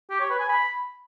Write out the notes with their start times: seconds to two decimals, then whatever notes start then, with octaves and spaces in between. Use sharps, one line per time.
0.10 G4
0.20 C#5
0.30 B4
0.40 G#5
0.49 B5